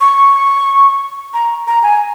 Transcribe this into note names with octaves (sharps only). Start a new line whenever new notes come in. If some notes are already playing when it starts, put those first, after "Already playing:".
C#6
A#5
A#5
G#5